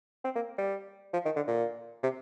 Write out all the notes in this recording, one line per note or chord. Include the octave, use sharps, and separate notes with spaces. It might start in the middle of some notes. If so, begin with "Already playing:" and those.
C4
A#3
G3
F3
D#3
D3
A#2
C3